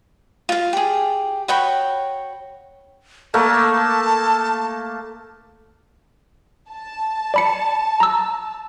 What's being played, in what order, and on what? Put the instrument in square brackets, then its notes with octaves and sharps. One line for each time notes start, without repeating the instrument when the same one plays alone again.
[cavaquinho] F4 F5
G4 G#4
F#4 C#5 G5 B5
[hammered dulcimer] A3 A#3 [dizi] A5
[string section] A5
[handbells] D5 B5 C#7
A#5 E6